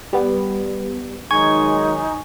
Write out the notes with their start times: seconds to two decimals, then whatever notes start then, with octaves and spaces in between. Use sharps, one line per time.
0.13 G3 B3
1.31 D#3 F#3 G#3 D#4 G#5 C#6